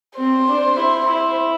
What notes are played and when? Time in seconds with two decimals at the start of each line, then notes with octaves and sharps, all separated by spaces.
0.18 C4 C5
0.48 D4
0.77 E4
1.06 E4